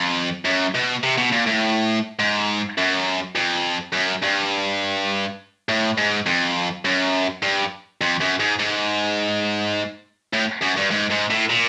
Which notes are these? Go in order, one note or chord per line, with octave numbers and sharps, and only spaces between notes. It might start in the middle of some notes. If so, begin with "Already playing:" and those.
Already playing: F2
F#2
B2
C3
B2
A#2
A2
G#2
F#2
F2
F#2
G2
A2
G#2
F2
F#2
G2
F2
F#2
G#2
G#2
A2
F#2
G2
G#2
G#2
A2
A#2